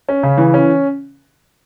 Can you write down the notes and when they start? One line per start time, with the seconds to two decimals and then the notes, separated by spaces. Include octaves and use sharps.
0.09 C#4
0.23 C#3
0.38 E3
0.54 C#4